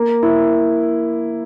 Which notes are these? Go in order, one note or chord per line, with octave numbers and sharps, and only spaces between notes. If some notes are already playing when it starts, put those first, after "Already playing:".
Already playing: A#3
E4